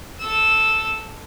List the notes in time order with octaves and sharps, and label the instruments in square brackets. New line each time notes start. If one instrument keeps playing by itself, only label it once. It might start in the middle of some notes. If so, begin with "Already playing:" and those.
[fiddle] A4 E6